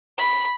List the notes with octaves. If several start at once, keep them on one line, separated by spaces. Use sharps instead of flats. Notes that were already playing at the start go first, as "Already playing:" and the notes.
B5